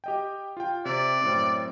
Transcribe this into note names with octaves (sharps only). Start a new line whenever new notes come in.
G4 D#5 G5
F4 G5
C3 D5
F#2 A2 C4